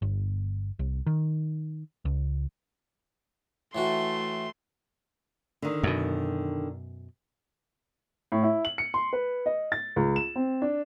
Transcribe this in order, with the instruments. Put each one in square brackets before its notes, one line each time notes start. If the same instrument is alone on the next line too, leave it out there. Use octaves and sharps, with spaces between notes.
[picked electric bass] G1
C2
D#3
C#2
[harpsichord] A2 E3 F#4 [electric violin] A3 C6
[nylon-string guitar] D3 D#3
[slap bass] F#2 B2
[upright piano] A2
E4
F#7
C#7
C6
B4
D#5
A6
C#2
E7
C4
D4